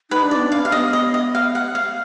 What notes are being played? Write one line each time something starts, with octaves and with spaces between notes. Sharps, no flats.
D#4 B4
D4
D5
B3
D4 F5
F5
B3 D#5
D#5
D#5
F5
F#5
F5